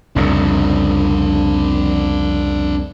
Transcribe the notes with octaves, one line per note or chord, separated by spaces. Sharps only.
C2 F2 C#3 D4 A#4